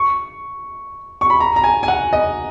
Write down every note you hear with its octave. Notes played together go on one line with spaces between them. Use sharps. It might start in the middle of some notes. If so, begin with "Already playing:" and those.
Already playing: C#6
C#6
B5
A#5
A#5
G#5
G#5
F#5
D#5